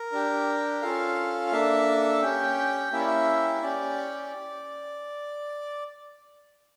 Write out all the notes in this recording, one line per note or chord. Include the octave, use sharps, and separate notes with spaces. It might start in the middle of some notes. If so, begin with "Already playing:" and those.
Already playing: A#4
D4 G4
C#4 F4 A4 F5
A#3 D4 A4 E5
C#4 G4 G5
A#3 C#4 E4 G4 E5
D5
E5
C#4 G4 D5